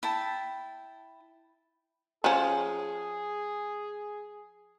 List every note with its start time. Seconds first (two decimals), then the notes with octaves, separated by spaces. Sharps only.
0.03 E4 G5 A5
2.24 F3 C#4 G#4